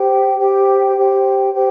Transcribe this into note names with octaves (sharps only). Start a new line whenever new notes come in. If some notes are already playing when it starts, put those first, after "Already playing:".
Already playing: G4 C5 G5
G4 C5 G5
G4 C5 G5
G4 C5 G5